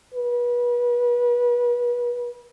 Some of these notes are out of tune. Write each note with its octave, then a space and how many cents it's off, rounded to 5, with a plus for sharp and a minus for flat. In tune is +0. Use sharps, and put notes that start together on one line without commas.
B4 -35